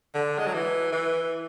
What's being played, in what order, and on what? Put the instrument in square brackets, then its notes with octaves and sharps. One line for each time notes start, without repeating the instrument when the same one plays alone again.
[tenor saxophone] D3
G#3
F#3
E3
E3